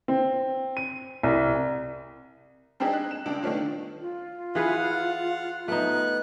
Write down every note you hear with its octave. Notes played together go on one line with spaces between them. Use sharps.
C4
D#7
C2
G3 C4 D4 D#4 G4 G#4
D#5 F#6
E7
C#2 D4
D#3 A3 B3 C#4 D4 F4
F4
E3 G#4 B4 F5 F#5
A3 B3 D#4 F#6